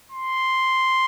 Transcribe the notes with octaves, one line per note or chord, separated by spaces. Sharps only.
C6